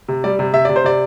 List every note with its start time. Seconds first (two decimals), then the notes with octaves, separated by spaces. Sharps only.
0.08 C3
0.24 G3 D5
0.39 C3
0.53 C3 E5
0.65 C3 D5
0.76 C5
0.84 C3 D5